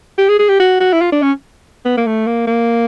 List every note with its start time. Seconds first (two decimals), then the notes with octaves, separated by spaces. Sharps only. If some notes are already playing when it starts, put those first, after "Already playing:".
0.18 G4
0.29 G#4
0.39 G#4
0.49 G4
0.60 F#4
0.80 F#4
0.93 E4
1.01 F4
1.12 D4
1.22 C#4
1.85 B3
1.97 A#3
2.06 A3
2.27 A#3
2.47 A#3